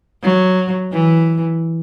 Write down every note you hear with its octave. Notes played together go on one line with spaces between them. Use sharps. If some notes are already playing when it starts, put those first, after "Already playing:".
F#3
E3